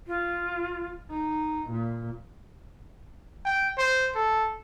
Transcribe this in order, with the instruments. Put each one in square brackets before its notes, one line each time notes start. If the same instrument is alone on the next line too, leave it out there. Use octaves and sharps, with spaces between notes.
[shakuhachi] F4
[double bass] D#4
A#2
[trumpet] G5
C5
A4